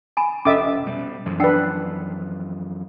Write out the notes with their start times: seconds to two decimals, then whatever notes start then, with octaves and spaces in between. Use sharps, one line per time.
0.17 G#5 A#5 B5
0.45 F1 C#4 A4 D#5 E5 D6
0.84 B2 G3
1.26 F#2 E3 F3
1.40 D4 B4 F#5 G5 E6